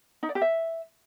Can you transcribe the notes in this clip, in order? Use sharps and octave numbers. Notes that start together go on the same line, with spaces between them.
D#4
D5
G4
E5